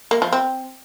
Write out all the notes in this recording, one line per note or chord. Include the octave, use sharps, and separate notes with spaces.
A#3
F3
C4